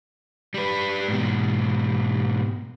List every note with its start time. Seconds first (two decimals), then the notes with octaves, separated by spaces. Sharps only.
0.54 G3 B4
1.08 G#2 B2